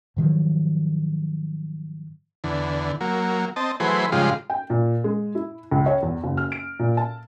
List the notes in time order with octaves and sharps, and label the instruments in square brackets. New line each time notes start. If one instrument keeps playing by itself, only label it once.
[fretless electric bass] G#2 D#3 F3 F#3
[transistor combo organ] E2 D3
F#3 A#3
C4 D#5 A5
E3 F#3 A3 G#4 B4 C5
G#2 C#3 F3 G3 G#3 F4
[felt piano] G5
A#2
G#3
E4
C#2
C#5
E2
F#1
F6
D7
A#2
A5